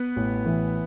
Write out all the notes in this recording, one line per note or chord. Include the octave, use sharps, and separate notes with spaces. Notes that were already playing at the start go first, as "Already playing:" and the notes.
Already playing: B3 B4
A1
E3